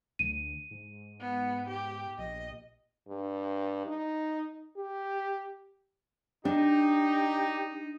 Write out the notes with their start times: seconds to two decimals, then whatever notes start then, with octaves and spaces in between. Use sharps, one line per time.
0.19 D2 D#7
0.71 G#2
1.20 B3
1.67 G4
2.18 A#1 D#5
3.08 G2
3.87 D#4
4.77 G4
6.45 D4 D#4 G4